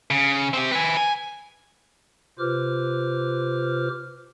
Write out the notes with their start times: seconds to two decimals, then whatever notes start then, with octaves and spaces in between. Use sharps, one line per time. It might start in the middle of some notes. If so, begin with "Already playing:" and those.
0.11 C#3
0.54 C4 G4
0.72 B4 G#5
0.97 G#5
2.39 C3 F4 B4 C5 D6 F6